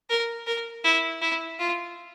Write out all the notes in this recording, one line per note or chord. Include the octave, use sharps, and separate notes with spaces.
A#4
A#4
E4
E4
F4